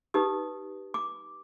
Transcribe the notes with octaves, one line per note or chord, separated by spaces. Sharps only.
D#4 G4 B4 D#6
D6